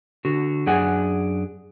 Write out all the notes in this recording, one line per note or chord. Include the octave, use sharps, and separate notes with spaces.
D3 F#4
F#2 D4 G#4 F#5 G#5